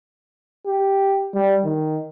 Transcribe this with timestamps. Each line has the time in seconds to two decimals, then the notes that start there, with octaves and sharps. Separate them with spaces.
0.66 G4
1.34 G3
1.64 D#3